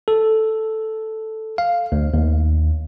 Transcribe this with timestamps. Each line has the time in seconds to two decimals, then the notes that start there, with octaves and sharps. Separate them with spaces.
0.08 A4
1.58 F5
1.92 D2
2.14 D#2